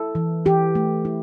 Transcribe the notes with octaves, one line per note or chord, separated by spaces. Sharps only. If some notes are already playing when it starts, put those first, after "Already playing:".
Already playing: E4 A4
E3
E3 G4
A3
E4